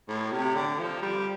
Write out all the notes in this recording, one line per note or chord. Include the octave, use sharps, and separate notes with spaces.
A2
C3
D3
F3
G3